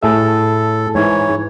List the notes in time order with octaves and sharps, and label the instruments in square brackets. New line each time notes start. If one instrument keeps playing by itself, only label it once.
[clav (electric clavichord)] A2 G#4 E5 [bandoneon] A4
[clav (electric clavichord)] G#2 [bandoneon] E3 C#5